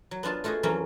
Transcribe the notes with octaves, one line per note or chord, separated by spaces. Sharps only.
F#3
B3 D4 F4 A5
A3 F4 F#4 G#4 D#5
F2 E3 F#3 A#3 C#4 A#5